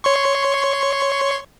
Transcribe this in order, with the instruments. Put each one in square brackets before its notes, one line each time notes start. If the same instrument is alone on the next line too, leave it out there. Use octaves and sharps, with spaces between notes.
[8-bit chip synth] C#5 C6 C#6